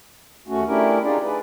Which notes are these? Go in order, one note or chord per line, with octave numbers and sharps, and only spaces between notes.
D#2 A3 C#4 F#4
A3 C#4 D4 E4 G4 A#4
D4 D#4 F4 G4 G#4 D5
G#4 B4